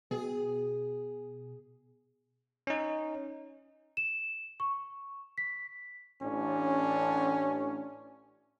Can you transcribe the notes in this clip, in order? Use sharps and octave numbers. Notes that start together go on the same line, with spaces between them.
B2 G#4
C#4 D#4
E7
C#6
B6
A1 C#4 D4